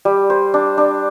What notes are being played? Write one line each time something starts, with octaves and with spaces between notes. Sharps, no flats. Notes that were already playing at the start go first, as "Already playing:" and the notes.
G3
C5
D4
D4